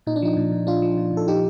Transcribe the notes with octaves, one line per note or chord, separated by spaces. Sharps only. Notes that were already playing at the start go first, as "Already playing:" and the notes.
A#2 D#4
D4
F3 D#4
A#2
A#2
A#2 D4 F4
F3
A#2
A#2 A4
F3 D#4 G4